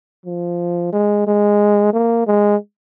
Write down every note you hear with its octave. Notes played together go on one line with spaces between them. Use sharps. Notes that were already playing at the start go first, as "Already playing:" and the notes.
F3
G#3
G#3
A#3
G#3